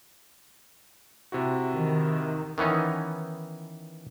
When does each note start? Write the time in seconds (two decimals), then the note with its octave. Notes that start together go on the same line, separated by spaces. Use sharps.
1.32 C3 E4 F#4
1.75 D#3
2.58 D#3 E3 B3 C#4 D#4